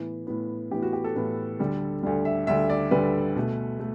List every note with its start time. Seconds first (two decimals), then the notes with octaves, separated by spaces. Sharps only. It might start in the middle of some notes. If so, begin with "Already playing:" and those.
Already playing: A2 E3 B3
0.27 A2 E3 B3
0.71 A2 E3 B3 G4
0.82 F#4
0.93 G4
1.04 A4
1.16 A2 E3 B3
1.59 D2 D3 G3
2.03 D2 D3 G3
2.25 E5
2.47 D2 D3 G3 E5
2.70 D5
2.91 D2 D3 G3 B4
3.36 B2 A3
3.80 A3